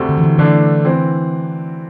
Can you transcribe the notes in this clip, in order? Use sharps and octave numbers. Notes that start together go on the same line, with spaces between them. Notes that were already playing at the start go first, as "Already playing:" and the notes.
Already playing: D2 C3 A3
D3
E3
D3
D3 E3 A3 D4
E3 C4